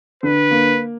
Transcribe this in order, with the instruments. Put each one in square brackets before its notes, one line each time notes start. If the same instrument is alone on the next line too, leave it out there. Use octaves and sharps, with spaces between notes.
[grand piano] D3 [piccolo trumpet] B4
[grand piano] A#3